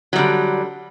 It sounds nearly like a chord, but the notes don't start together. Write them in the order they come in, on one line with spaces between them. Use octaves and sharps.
F#3 G3 D3